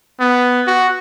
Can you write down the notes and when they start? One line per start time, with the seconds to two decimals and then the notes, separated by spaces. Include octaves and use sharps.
0.20 B3
0.67 F#4